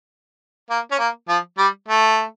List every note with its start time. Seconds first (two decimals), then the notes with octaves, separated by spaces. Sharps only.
0.70 A#3
0.91 C#4
0.99 A#3
1.28 F3
1.58 G3
1.88 A3